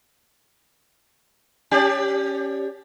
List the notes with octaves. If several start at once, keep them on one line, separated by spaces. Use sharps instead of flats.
C#4 G4 D5